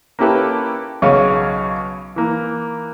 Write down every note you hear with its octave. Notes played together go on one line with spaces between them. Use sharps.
A#3 C#4 E4 G4 A4 B4
B1 C#3 C#5 F5
E3 A#3